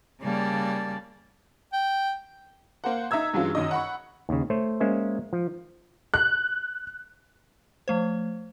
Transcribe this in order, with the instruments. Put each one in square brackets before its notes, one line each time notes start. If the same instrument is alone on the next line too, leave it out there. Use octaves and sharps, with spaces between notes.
[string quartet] C#3 G3 A#3 D5 A5
[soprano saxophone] G5
[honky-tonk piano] A#3 C5 F#5
D#4 E5 A#5 E6 G#6
G2 E3 F#3 G#3 C#4 F4
F#2 D#3 D#5
F#5 B5 C#6
[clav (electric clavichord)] D#2 C#3
A3 C5 C#5
G#3 A#3 C#4 C5 E5
F3
[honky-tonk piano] F#6
[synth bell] F3 A3 C5